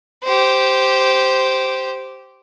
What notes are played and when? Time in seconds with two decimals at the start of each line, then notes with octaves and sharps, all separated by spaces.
0.24 G4 C5